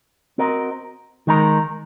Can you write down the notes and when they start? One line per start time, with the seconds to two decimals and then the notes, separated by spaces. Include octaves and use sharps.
0.38 C4 F#4 A#4 D#5
1.27 D#3 G#3 D#4 A#4